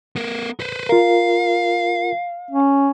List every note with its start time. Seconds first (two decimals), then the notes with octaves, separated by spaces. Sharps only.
0.16 B3 A#4
0.60 B4 C5
0.89 F4 A#4 F5
2.51 C#4